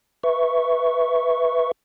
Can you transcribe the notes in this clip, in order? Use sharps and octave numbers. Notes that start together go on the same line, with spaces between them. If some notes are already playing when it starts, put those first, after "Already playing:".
B4 E5 C#6